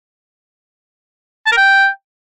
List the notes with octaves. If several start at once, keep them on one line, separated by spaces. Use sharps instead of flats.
A5
A#4
G5